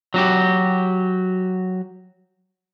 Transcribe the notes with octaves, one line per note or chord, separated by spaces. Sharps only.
F#3 F#4 G4